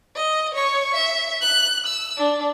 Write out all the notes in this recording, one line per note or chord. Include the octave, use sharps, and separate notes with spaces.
D#5
C#5 C#6
E5
F#6
E6
D4